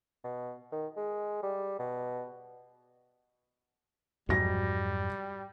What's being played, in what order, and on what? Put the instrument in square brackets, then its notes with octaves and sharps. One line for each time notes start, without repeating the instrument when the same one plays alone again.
[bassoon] B2
D#3
G#3
G3
B2
[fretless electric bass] F2 G#2 F#3 [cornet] G3 [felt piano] F#4 A#6